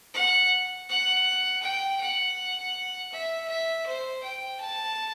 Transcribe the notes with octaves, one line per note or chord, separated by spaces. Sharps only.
F#5
F#5
G5
F#5
E5
E5
C5
G5
A5